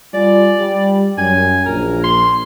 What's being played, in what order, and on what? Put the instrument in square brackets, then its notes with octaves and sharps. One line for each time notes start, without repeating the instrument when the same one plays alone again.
[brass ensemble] G3 F4 G#5 [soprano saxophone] D5
[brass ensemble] G3
[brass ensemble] F#2 [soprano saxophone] G#5
[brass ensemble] A#1 [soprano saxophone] A#4
[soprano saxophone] C6